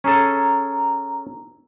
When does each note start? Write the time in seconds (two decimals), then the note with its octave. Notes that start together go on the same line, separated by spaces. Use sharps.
0.04 C#4 G#4 A4 A#5